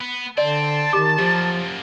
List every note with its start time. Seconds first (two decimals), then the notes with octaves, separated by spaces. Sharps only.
0.01 B3
0.38 D3 C4 D5 A5
0.93 D#3 G4 D6
1.18 F#2 F3 A#3 G4